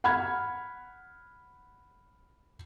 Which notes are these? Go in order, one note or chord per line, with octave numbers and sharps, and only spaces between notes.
F#5 B5 F6 G#6